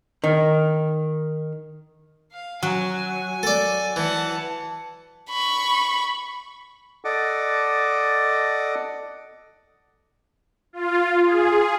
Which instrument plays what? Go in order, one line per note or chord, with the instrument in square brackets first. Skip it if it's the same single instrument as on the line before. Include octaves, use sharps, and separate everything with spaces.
[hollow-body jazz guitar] D#3
[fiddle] F5
[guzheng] F#3 [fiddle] G#5
[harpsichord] A4 D5
[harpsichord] E3 [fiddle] F#5 A5
[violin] B5 C#6
[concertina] A4 D5 D#5 F#5 D6
[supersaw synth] F4
G#4